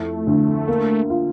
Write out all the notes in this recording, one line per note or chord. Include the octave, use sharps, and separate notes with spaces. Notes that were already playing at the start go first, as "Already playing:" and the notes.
Already playing: F2 A3 E4
D2
A#3
F4